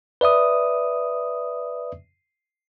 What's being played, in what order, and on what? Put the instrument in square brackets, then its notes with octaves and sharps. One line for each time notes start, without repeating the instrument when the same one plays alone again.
[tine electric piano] B4 D5 E5 D#6